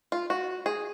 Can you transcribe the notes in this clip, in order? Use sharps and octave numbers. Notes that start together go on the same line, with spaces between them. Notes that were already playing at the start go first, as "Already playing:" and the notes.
F4
F#4
G#4